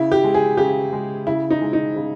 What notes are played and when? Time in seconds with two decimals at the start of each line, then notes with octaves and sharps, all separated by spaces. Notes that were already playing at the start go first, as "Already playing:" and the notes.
Already playing: C#3 E4
0.12 G4
0.24 G#3
0.34 G#4
0.57 C#3 G4
0.93 G#3
1.27 C#3 E4
1.50 D#4
1.62 G#3
1.73 D#4
1.96 C#3